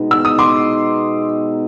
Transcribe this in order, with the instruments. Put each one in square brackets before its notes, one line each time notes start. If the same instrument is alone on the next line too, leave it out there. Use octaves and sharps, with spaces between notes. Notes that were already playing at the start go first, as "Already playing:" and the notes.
Already playing: [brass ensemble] B2 G#3 B3 D#4
[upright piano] E6
D#6
C6 D6